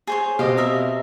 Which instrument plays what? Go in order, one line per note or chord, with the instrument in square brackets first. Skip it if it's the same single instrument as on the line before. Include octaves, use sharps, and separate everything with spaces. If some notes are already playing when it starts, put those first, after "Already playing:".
[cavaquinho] G#4 C5 C#5
[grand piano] B2 C4 D#6 [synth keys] G4 [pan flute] D#5 [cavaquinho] F5
[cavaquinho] A#4 E5 F5